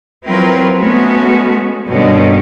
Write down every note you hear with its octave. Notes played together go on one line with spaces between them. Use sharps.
F#3 C4 E4 F4 A#4 B4
G#3 A3 B3 C#4 F#4
G2 B2 D3 D#3 A#3 C#4